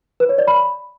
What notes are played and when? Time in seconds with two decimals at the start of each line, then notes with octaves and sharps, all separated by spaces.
0.20 B4
0.29 C#5
0.38 D5
0.48 B5